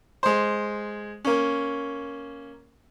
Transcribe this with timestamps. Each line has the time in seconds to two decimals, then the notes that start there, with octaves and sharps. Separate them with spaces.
0.23 G#3 C5
1.25 A#3 C#4